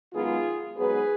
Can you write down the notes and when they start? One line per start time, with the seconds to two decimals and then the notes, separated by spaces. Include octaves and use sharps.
0.14 F#2 D#3 G#3 B3 F4 G#4
0.77 G#2 F#3 B3 G#4 B4